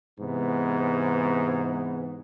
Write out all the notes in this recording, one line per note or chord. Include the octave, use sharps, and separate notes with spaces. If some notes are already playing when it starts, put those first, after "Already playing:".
G#2 C3 E3 B3